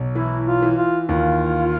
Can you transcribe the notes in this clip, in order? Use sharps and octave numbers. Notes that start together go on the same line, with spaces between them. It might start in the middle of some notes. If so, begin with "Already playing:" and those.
Already playing: B1
E3 E4
F4
E3
F4
D#2 F4